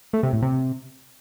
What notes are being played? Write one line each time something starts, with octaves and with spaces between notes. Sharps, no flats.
A3
C3
A2
C3